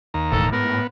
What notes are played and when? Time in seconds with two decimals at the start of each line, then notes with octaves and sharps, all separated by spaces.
0.14 D#2 A#5
0.32 E1 A2 A4
0.53 G#2 B3 A#4